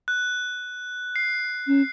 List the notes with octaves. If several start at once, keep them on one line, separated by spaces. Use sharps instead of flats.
F#6
C7
C#4